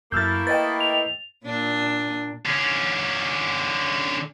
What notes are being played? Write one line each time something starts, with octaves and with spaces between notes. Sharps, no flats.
F#2 A3 A#3 E4 E6 F6 G6 A6
B4 D#5 G5 A6
F7
A#2 D4
D3 C#4